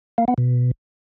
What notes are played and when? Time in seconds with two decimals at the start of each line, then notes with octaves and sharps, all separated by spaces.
0.18 A#3
0.28 B3
0.38 B2